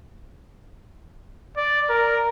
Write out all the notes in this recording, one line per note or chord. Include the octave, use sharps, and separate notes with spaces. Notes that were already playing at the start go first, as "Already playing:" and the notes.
D5
A#4